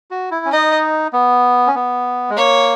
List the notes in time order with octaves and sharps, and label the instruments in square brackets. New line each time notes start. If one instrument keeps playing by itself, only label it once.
[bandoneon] F#4
E4
C#4
[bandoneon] D#4 [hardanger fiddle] D#5
[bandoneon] B3
C#4
B3
G#3
[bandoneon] A#3 [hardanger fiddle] C#5